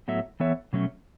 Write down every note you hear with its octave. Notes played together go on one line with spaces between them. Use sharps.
A2 F#3 B3 A4 E5
E3 B3 A4 C#5 E5
B2 F#3 A3 C#4